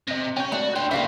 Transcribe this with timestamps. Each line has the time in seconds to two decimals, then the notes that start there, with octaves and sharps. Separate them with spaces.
0.08 C3 D#5 A#6
0.37 C#4 C#5 G5 G6
0.52 A3 D4 F#4
0.76 D4 C5 G5
0.91 C#3 E3 G3 A3 A#3 E5 F5